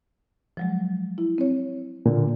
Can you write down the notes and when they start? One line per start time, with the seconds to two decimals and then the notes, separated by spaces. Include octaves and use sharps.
0.57 F3 F#3 G#3
1.18 E4
1.38 C4 C#5
2.06 A#2 D3